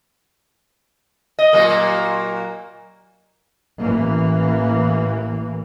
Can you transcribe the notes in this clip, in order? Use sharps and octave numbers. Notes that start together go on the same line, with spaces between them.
D#5
A#2 F#3 A#3
A1 E3 A#3